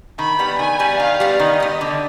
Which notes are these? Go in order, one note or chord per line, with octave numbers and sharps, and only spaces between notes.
D#3 B5
G3 B3
D#3 G#5
G3 B3
D#3 F5
G3 B3
D#3 D#5
G3 B3
D3